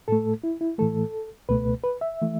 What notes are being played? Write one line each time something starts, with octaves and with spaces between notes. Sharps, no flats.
A2 A3 A4
E4
E4
A2 E3 A3 A4
C#2 B2 A3 B4
B4
E5
E3 A3